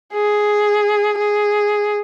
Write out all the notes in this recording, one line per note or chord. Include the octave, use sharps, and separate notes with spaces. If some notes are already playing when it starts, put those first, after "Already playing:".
G#4
G#4